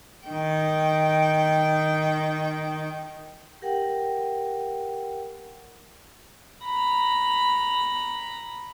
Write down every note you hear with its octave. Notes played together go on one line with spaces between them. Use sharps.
D#3 G5
G4 A#4 F#5 G5
A#5 B5